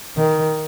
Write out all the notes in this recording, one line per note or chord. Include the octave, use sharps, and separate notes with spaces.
D#3